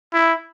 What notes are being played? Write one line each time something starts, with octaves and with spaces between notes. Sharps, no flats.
E4